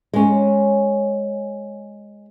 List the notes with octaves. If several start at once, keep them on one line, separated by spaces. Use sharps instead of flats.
G#3 C#4